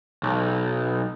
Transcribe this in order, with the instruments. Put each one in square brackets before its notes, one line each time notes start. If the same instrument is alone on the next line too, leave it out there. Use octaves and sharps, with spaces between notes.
[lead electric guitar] B1